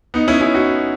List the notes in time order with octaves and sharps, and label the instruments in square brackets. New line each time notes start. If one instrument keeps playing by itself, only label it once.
[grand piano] B3 D#4
C#4 E4
C#4 E4
D#4 F#4